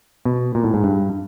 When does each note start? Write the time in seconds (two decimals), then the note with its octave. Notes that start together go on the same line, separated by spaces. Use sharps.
0.25 B2
0.55 A#2
0.64 A2
0.74 G#2
0.84 G2